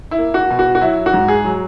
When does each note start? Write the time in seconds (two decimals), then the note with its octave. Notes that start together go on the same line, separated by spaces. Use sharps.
0.11 E4
0.18 A#3
0.34 F#4
0.50 B2
0.59 F#4
0.75 F#4
0.81 F#3 E4
1.06 F#4
1.13 G#2
1.28 G#4
1.44 F#3